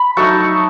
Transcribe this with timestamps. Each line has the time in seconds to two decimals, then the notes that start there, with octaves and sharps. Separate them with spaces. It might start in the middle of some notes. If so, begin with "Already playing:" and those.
Already playing: B5
0.17 F#3 A3 D#4 A5 C#6